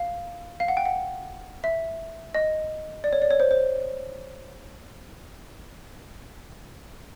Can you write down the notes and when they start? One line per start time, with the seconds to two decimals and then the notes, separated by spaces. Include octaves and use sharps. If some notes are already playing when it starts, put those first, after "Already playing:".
Already playing: F5
0.60 F5
0.68 F#5
0.77 G5
0.85 F#5
1.64 E5
2.35 D#5
3.04 D5
3.13 C#5
3.22 D5
3.31 C#5
3.40 C5
3.51 C5